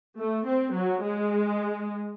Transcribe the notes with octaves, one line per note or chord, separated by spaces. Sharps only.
A3
C4
F#3
G#3